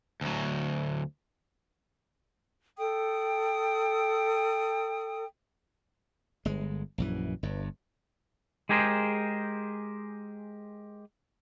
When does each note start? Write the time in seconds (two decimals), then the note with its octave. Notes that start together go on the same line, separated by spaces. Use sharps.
0.21 D2 F#3
2.78 A4 G5 D#6
6.45 G1 G#3
6.98 A#1 F#2 E3
7.43 G1 G2
8.69 G#3 G4 G#4 A#4 C5